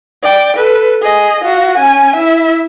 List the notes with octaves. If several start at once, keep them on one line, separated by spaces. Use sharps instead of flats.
D5 G5
A4 B4
G#4 D#5
F4 F#4
C#4 G#5
E4 E5